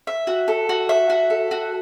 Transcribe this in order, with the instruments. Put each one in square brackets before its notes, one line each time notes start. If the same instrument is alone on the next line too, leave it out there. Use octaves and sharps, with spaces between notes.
[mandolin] E5
F#4
A4
F#4
E5
F#4
A4
F#4